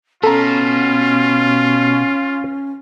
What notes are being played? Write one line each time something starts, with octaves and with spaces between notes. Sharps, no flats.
B2 C#4 F4 A4 A#5